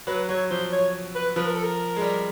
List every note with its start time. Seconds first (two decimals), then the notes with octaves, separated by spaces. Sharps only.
0.07 F#3 B4
0.29 F#3 C#5
0.50 F3 C5
0.72 C#5
1.15 B4
1.36 F3 B4
1.46 A#4
1.55 A4
1.63 A#4
1.96 G#3
2.02 G3